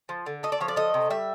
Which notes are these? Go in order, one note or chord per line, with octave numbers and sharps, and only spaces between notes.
F3
D3
A3 D#5
D5
F3 C#5
D5
A3 D#5
C3
G3 E5